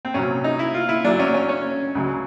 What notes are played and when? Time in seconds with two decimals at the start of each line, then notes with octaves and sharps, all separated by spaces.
0.05 C4
0.14 C2 A#2 F#3 C#4
0.44 D#4
0.59 E4
0.74 F4
0.89 E4
1.04 F#2 D3 F#3 D4
1.19 C#4
1.34 C#4
1.49 C#4
1.95 C#2 C#3 F#3